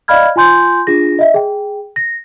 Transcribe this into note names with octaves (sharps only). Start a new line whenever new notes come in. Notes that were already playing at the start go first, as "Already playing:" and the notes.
D5 D#5 F5 B5 F6 G#6
F4 G#5 C6 G6
D4 F4 G#4 A#6
D#5 E5
G#4 G5
A#6